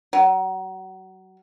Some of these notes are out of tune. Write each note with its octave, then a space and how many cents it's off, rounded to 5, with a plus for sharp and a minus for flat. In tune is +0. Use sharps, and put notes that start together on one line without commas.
F#3 +30